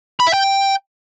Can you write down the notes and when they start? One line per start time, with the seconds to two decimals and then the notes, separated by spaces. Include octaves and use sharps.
0.20 B5
0.27 E5
0.34 G5